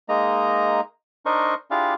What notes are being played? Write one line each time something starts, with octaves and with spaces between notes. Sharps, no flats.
G#3 A#3 D#4 D#5 A#5
D4 D#4 A#4 C5 D#5 C#6
D4 E4 F4 G4 G#4 F5